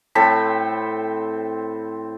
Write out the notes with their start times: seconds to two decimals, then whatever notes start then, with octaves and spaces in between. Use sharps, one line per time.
0.15 A2 C4 A4 B5